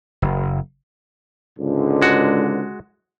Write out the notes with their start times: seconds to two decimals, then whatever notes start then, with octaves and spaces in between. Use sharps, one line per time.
0.22 F#1
1.59 C#2 G#2 D3
2.02 G#3 F#4